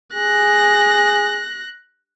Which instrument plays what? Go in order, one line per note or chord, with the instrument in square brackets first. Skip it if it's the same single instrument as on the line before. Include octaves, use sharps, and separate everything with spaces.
[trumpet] G#4 [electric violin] F#6 A#6